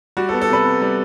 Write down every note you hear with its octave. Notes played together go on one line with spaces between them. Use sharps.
G3 F#4
A4
B3
A4
C3 B4
C3
G3